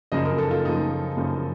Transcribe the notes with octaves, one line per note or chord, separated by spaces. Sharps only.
F#2 C#3 F3 D#5
A#4
A4
F4
F#2 C#3 F3 D#4
F#2 C#3 F3